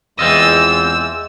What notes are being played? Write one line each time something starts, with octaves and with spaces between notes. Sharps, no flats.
E2 E3 G#3 C4 F4 D#5 E6